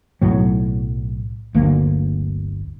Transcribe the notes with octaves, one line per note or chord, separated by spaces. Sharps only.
B1 A2 F#3
D1 G1 D2 A#3